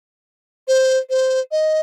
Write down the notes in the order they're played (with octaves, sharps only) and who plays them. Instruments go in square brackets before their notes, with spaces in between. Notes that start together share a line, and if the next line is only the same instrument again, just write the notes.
[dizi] C5
C5
D#5